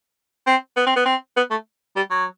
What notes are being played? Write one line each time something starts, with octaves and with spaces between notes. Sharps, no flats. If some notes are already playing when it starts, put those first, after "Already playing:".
C4
B3
C4
B3
C4
B3
A3
G3
F#3